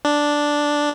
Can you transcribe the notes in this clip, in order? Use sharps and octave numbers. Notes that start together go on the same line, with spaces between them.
D4